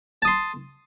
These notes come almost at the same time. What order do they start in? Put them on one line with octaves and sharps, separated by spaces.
A5 D#6 C6